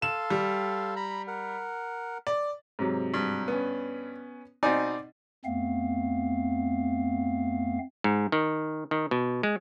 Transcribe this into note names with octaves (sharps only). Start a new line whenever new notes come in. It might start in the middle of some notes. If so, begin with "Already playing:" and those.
A4 F5 C6 E7
G3
A#5 B5
A#4 F#5
D5
G#2 C3 F#3
G2
B3 C#4
B2 C4 D#4 D5 G#5
F2 A3 B3 C4 F5
G#2
D#3
D#3
B2
G#3